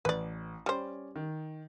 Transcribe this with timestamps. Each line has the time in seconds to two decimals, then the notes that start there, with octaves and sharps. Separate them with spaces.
0.05 A1 B4 D5
0.66 G3 C#4 C5 D5
1.16 D#3